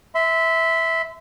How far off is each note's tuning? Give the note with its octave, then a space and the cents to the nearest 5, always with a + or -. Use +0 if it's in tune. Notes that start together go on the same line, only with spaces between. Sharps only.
E5 -10 C6 -35